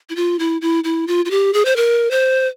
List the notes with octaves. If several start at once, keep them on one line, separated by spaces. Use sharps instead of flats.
E4
F4
E4
E4
E4
F4
F4
G4
G#4
C5
A#4
C5